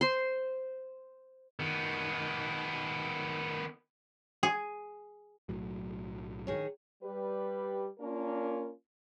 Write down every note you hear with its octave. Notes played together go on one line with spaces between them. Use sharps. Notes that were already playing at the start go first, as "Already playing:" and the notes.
C5 C6
D#3 B3
G#4
B1 A2 F#3
D#3 G#4 C#5
G3 G4 B4
A#3 C#4 D4 F4 A#4